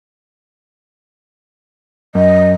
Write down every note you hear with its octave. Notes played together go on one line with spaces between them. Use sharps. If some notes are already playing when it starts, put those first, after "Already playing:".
F#2 D#5